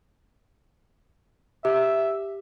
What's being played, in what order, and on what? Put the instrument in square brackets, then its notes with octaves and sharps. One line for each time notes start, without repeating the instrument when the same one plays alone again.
[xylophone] G4 [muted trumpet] E5